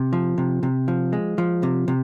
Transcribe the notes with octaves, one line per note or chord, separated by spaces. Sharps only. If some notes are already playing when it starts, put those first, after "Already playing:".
Already playing: C3
F3
C3
C3
F3
G#3
F3
C3
C3